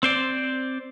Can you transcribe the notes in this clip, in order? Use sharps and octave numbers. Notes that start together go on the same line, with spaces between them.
C4 C5 D5